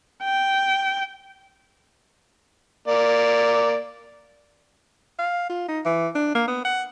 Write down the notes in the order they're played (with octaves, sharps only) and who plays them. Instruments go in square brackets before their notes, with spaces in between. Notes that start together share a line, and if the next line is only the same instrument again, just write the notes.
[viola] G5
[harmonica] A#3 D5
[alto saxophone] F5
F4
D#4
E3
D4
A#3
B3
F#5